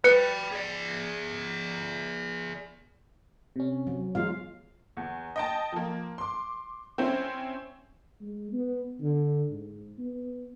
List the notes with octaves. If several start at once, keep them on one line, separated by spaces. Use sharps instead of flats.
B4 G5 B5 C#7
G#4 D5
C3 C#4
F#3
E2 G#3 F4 F5
E2
D#5 G5 A5
F3 A#3
C6 D6
C4 C#4 E4 C5 G#5
G#3
B3
D3
G#2
B3